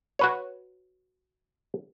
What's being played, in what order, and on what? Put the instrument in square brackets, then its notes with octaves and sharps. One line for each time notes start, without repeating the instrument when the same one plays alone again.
[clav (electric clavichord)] F#4 B4 C#5